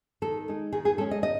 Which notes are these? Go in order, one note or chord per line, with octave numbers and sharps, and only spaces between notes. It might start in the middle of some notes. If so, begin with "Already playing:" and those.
D#3 A4
G#3 D#4
D#3 G#4
G#4
G#3 C#4 A4
D#5
D#3 D#5